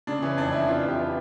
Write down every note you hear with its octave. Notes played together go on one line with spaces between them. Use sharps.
C#3 D4
E3 C#4
F2 D4
F2 E4
E3 F4
F2
G4
E3